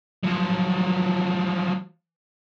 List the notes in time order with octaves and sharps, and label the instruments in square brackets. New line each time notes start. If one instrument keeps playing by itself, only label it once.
[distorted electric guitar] F3 F#3